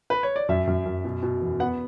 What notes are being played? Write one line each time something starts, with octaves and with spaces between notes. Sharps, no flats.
B4
C#5
D5
F#2 E5
F#2
F#2
B2
B2
E2
B3 F#5